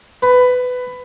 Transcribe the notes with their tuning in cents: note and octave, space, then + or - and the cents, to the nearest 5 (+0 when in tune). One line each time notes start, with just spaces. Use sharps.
B4 +15